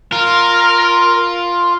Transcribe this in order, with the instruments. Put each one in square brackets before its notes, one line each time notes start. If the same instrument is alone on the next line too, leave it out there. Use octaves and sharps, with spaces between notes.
[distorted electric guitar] F4 [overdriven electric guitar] A#4